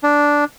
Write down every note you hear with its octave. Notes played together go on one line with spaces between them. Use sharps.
D4